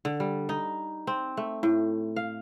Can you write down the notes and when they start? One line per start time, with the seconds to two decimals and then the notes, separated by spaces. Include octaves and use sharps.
0.05 D3
0.20 G3
0.49 D#4
1.07 C4
1.37 A3
1.63 A2
2.16 F5